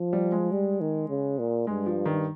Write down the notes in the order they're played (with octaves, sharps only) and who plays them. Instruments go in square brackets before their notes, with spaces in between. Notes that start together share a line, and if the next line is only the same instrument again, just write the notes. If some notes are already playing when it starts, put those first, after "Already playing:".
Already playing: [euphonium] F3
[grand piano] G3
G#3
[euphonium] G3
D#3
C#3
A#2
[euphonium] G2 [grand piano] G#3
[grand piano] F3
D#3